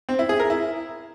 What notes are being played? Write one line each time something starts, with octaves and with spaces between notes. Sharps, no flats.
C4
E4
G#4
A#4
E4